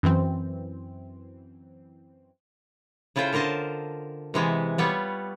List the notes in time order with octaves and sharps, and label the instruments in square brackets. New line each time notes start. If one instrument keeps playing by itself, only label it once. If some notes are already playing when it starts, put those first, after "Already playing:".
[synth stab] F#2 E3 C4
[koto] C#3 E4 F4 A4 C5 G5
D3 A#4 C5 D#5 A5
C3 E3 G#3 B3
G3 B3 F4 C#5